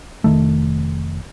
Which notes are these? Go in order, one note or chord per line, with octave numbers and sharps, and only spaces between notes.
F1 D#2 D#3 A3